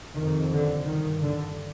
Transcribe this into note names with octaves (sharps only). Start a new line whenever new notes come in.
F2 C3 D#3
D3
G2 D#3
D3